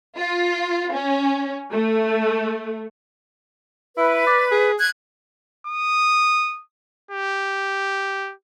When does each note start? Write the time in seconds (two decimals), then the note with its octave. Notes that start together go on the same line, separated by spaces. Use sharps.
0.17 F4
0.91 C#4
1.71 A3
3.97 E4 B4
4.27 D5
4.52 G#4
4.78 F#6 G#6
5.67 D#6
7.11 G4